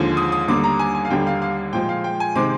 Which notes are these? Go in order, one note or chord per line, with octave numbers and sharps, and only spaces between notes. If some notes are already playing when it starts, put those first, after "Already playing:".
Already playing: D#2 D3 F3 G#3
D#6
D#6
D#2 D3 G3 A#3 D6
A#5
G#5
G#5
F5
D#2 D3 G3 A#3 G5
F5
F5
A#2 F3 G#3 G5
F5
G5
G#5
C3 D#3 G#3 C4 D6